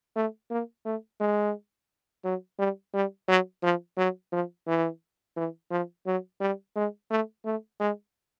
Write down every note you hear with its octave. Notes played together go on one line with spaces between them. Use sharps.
A3
A#3
A3
G#3
F#3
G3
G3
F#3
F3
F#3
F3
E3
E3
F3
F#3
G3
G#3
A3
A3
G#3